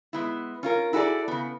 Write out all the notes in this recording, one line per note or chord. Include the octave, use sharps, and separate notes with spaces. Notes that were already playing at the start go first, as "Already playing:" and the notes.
G#3 B3 E4
C#4 F4 A#4
E4 F#4 G#4 A4 D5
C#3 B3